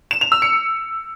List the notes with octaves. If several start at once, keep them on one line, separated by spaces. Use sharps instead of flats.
E7
F7
E6
C#7